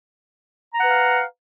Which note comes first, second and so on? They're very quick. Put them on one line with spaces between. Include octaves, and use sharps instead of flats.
A#5 F#5 B4 F5